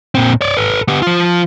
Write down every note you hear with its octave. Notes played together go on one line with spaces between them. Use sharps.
A#2 C4
C#5 D5
A4 B4
B3 G4
F3 F4